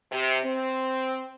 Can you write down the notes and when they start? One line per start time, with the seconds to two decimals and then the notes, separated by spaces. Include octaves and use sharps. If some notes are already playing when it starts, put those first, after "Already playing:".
0.12 C3
0.44 C4